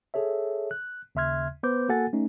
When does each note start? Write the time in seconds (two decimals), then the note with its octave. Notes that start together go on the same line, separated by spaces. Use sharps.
0.14 G#4 A4 C#5 E5
0.71 F#6
1.15 D#2 C#3 E5 C6 F6 G#6
1.63 B3 B4 C5 D6 G6
1.89 A#3 F#4 A4 F#5 G#5 A6
2.13 A3 C#4 D#4